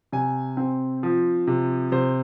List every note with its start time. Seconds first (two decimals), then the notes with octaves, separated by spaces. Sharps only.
0.12 C3 G#5
0.57 C4
1.03 F3
1.47 C3
1.92 C3 C5